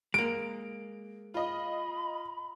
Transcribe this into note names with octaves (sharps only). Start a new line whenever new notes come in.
G#3 A#3 D7
F4 D#5 B5